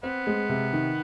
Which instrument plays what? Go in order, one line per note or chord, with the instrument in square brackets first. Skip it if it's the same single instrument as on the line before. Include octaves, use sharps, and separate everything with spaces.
[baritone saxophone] B3 [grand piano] C4
[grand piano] G#3
C3
D#3